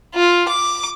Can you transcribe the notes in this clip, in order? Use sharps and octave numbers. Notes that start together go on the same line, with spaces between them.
F4
D6